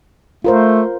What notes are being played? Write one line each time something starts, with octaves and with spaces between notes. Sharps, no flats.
A3 F4 A#4 C5